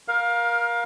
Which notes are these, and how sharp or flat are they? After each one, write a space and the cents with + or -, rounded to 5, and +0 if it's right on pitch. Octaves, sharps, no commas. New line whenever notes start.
A#4 +25 F5 +15